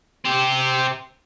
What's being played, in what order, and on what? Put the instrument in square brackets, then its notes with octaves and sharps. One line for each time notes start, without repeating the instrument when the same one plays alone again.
[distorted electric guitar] C4 G4